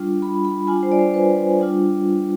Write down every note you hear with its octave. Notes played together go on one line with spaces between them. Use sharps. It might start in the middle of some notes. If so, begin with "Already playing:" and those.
Already playing: G3 D4 F4
B5
B5
G3 D4 F4 G#5
C5
D5
C5
B4
G3 D4 F4